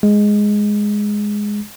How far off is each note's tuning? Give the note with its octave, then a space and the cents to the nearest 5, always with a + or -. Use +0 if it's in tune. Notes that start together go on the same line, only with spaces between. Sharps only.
G#3 +0